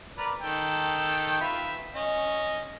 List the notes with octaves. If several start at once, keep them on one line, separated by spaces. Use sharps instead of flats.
A#4 B4 D5
D#3 A4 G5
F4 B4 E5
C#4 D#5